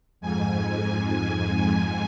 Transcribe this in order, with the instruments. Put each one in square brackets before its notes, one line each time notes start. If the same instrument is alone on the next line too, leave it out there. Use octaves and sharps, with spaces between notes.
[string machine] F2 G#2 G#5